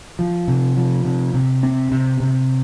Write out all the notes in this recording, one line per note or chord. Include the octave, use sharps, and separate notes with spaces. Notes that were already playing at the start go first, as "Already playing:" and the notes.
F3
C3
F3
C3
C3
C4
C3
C3